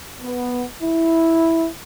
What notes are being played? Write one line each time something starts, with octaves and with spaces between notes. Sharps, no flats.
B3
E4